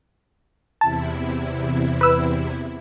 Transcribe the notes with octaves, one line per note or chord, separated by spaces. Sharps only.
E2 C3 E4 A5
B4 B5 E6